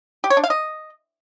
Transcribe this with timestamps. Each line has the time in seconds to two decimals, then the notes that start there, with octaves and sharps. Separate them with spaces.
0.24 G4
0.30 C#5
0.37 D4
0.44 F5
0.50 D#5